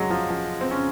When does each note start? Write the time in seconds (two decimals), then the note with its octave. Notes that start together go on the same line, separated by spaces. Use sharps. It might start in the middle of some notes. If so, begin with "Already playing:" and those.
Already playing: F#3 G#3
0.10 F3
0.30 F3
0.61 C4
0.71 C#4